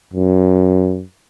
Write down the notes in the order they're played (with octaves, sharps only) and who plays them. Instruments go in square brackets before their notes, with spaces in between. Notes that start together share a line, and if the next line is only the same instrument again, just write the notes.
[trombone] F#2